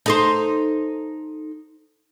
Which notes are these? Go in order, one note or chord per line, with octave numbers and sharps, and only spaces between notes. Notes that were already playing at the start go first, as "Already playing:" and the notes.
D#4 A4 C5